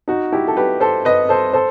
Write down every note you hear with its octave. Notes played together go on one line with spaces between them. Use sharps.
D#4 F#4
E4 G4
A4
G4 B4
A4 C5
B4 D#5
A4 C5
A4 C5